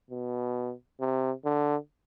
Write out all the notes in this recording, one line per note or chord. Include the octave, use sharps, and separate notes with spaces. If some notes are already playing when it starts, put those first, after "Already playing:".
B2
C3
D3